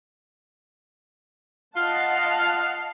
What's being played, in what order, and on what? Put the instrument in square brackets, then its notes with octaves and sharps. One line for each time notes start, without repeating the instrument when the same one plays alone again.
[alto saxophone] F4 [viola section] D#5 F#5 A5 [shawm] F5